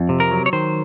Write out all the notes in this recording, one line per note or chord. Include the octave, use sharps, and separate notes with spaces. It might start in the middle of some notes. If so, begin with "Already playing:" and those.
Already playing: F2
C3
A#4
F#3
C#5
D#3 C5